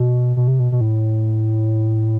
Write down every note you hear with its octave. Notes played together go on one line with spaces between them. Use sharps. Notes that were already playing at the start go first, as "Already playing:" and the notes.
Already playing: B2
B2
C3
B2
B2
A2